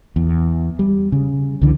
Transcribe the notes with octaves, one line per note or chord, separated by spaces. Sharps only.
E2
G3
C#3
C#2 D3 E3